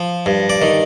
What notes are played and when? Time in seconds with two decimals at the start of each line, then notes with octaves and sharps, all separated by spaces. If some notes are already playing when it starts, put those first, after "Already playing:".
Already playing: F3
0.26 G2
0.50 D5
0.62 D#3